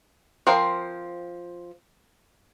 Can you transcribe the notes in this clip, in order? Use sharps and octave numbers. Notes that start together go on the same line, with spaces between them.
F3 C4 A#4 C5 F5